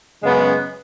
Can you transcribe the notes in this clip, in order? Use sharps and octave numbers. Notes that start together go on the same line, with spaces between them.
F#2 C#3 G#3 B3